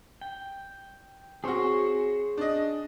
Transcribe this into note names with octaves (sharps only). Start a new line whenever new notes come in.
G5
C4 F#4 G#4 C#5 C6
D4 D#5